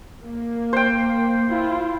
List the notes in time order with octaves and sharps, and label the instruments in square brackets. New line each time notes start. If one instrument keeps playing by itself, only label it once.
[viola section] A#3
[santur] C5 G5
[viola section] E4 F4